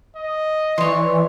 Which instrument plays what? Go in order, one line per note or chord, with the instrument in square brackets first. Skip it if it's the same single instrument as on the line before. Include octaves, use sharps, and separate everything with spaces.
[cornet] D#5
[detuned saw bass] E3 [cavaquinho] C#5 C6 [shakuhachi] D5